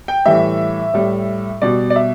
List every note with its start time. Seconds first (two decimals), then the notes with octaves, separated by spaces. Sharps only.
0.08 G5
0.26 A2 E3 G3 E5
0.94 A2 G3
1.61 B2 G3 D5
1.90 D5
1.96 E5